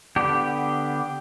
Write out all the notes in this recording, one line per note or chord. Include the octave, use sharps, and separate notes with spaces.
D3 B3 D4 G4